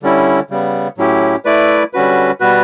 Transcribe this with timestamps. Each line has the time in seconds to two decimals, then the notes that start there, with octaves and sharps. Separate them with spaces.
0.03 D3 G3 C#4 E4
0.50 C#3 G3 B3
0.98 A2 F#3 C#4 E4 G4
1.45 A3 E4 B4 D5
1.93 D3 G3 C#4 F#4 B4
2.40 B2 G3 B3 F#4 B4